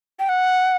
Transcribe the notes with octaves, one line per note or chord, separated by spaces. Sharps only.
G5
F#5